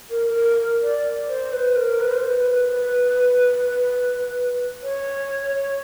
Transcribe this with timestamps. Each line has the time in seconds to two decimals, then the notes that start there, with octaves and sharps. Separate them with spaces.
0.11 A#4
0.35 A#4
0.83 D5
1.29 C5
1.53 B4
1.76 A#4
2.00 B4
2.10 C5
2.20 B4
4.83 C#5